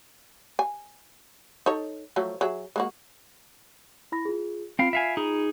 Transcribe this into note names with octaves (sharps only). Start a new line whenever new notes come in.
G#5
D#4 A4 C#5
F3 F#3 A3
F#3 G#4 E5
G#3 A#3 F#4
E4 B5 A#6
F4 G#4
C4 F4 F5 B5 D7
E5 F5 G#5
D#4 G#4